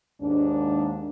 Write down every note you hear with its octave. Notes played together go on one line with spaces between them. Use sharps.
D#2 G#2 D4